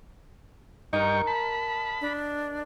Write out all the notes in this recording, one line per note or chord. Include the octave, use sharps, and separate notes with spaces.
G2 D#4 A#4 D#5 G5 C#6
A5 B5
D4